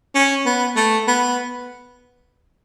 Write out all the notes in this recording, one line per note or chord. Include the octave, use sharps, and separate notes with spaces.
C#4
B3
A3
B3